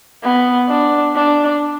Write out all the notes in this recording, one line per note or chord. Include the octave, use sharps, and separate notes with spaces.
B3
D4
D4